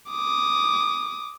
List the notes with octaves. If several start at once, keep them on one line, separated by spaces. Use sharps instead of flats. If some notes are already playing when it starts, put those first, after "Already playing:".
D6 D#6